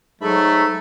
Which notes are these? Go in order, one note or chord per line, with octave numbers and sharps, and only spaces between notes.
G#2 F#3 A3 A4 E5 B5